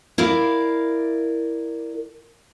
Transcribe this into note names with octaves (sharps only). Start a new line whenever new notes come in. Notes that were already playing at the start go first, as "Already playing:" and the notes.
E4 A#4 D5 F5